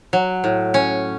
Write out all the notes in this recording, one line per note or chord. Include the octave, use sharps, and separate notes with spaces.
F#3
A2
C#4